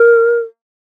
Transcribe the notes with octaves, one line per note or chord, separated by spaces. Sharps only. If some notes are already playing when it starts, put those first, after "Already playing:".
Already playing: A#4